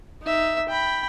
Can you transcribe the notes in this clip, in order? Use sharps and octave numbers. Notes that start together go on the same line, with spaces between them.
D#4 E5
G5 B5